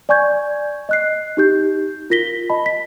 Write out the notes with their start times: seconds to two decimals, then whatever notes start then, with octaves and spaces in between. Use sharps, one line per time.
0.09 D5 G#5 C#6 G6 G#6
0.89 D#5 F#6 C7
1.37 D#4 G4 G6
2.10 F4 A#4 A#6 B6 G7
2.50 D#5 A5 B5
2.66 B6